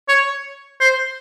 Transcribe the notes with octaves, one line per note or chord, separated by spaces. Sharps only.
C#5
C5